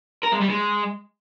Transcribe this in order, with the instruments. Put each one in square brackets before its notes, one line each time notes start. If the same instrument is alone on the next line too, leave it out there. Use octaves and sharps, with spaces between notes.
[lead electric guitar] A#4
G#3
G3
G#3